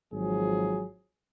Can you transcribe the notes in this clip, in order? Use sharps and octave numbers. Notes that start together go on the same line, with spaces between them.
G#1 F3 F#3 G#4